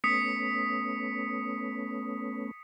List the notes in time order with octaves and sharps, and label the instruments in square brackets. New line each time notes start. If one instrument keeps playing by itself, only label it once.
[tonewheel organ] A3 B3 C#4 [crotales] D#6 B6 C#7